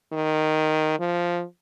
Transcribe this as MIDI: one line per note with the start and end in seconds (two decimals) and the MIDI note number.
0.13 0.96 51
1.00 1.43 53